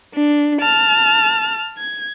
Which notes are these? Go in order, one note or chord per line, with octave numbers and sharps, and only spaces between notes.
D4
A5 F6
G#6